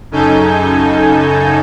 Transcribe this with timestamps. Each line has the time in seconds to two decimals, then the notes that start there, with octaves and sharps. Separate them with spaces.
0.11 F#2 C#3 D#4 A4 G#5 G6